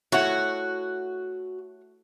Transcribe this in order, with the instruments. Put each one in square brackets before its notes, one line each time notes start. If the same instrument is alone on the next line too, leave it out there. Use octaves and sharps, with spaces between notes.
[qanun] A3 E4 [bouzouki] F#4 [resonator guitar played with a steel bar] C#5 F#5